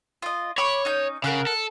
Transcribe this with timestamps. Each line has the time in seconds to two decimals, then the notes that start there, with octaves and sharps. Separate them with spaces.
0.22 F4 D#5
0.58 C#5 B5 C#6 D6
0.85 C#4 D#4 G6
1.24 C#3 A#4 F#5 F6
1.47 A4